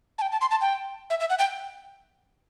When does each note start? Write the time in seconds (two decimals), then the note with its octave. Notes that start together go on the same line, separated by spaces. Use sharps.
0.18 A5
0.22 G5
0.32 A5
0.41 C6
0.51 A5
0.61 G5
1.10 E5
1.20 E5
1.30 F#5
1.39 G5